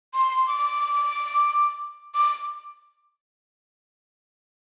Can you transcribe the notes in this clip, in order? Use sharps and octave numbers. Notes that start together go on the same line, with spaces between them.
C6
D6
D6